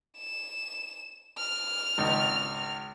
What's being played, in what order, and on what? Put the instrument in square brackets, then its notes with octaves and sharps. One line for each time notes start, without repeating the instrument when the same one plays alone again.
[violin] E7
F6
[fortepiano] G#1 C#2